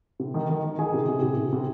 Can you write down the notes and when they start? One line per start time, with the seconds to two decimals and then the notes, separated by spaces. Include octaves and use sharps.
0.19 C3
0.34 D#3
0.49 D#3
0.64 D#3
0.79 D#3 G#4 G#5
0.94 C3
1.08 C3
1.23 C3
1.38 C3
1.52 C3